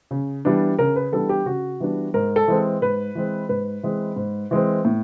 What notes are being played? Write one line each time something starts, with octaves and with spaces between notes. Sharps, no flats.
C#3
E3 G3 B3 D4
C#3 A#4
B4
E3 G3 B3 D4 A4
G4
C#3 F#4
E3 G3 B3 D4
G#2 A#4
A4
E3 G#3 C4
G#2 B4
E3 G#3 C4
G#2 B4
E3 G#3 C4
G#2
E3 G#3 C4
A2